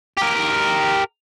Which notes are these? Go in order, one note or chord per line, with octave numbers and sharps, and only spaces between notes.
G4 A#4